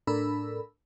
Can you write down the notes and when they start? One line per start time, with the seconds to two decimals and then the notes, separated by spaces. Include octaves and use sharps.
0.07 A2 D4 A4 A#4 B5 E6